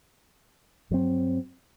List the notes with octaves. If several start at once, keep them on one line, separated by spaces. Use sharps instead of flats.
G2 F#3 C4